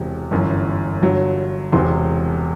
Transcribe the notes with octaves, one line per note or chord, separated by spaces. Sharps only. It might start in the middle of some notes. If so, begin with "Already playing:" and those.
Already playing: E1 E2 C3
G1 F#2 E3
G1 G2 F#3
E1 E2 C3 C6